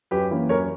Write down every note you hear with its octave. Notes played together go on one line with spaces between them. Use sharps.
F#2 G4 B4
E3 A#3 C#4
F#2 A#4 C#5